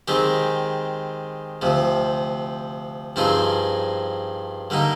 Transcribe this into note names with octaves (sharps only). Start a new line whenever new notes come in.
D#3 G#3 C4 G4
D2 C3 F3
G2 F3 C4 D#4 G#4
D3 G3 A#3 D#4